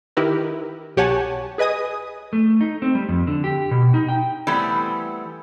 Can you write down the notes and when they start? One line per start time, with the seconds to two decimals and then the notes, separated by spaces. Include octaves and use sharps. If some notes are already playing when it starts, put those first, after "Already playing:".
0.17 D#3 E4 G4 A#4 B4
0.97 B1 G4 C#5 F#5 G#5 A5
1.58 G#4 B4 D#5 G#5 D#6
2.33 A3
2.61 D#4
2.82 C4
2.95 G3
3.09 F2
3.27 D3
3.44 G4
3.71 B2
3.94 D#4
4.09 G5
4.47 E3 G3 A3 B3 C4